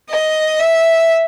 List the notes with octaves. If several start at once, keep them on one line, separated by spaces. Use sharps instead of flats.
D#5
E5